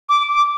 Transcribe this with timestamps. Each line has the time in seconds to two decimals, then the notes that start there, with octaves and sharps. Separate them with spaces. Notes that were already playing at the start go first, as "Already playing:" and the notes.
0.09 D6
0.29 D6